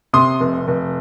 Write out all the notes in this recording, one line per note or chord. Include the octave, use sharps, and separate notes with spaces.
C3 C6 D#6
F1
F1